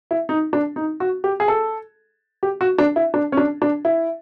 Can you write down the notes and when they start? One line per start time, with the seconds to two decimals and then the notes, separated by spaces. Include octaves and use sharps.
0.11 E4
0.29 D#4
0.53 D4
0.76 D#4
1.00 F#4
1.24 G4
1.40 G#4
1.48 A4
2.43 G4
2.61 F#4
2.78 D4
2.96 E4
3.14 D4
3.32 C#4
3.37 D4
3.62 D4
3.85 E4